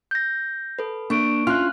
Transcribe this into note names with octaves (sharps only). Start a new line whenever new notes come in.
G6 A#6
A4 B4
A#3 D4 C#6 D7
C#4 F4 F6 F#6